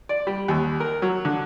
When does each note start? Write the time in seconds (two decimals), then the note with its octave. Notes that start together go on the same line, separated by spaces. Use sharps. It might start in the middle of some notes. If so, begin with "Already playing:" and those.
0.09 D5
0.27 G3
0.48 D#2
0.80 A#4
1.02 F#3
1.25 D3